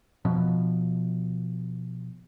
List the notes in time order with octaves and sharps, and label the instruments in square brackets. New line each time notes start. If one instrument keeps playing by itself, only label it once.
[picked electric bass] B2 F3